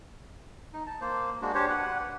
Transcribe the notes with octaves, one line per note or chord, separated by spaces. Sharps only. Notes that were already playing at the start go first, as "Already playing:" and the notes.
D#4
A5
A#3 C5
G#3 A#3 D4 F#4
D4 G4 C5 C#5
B4 F#5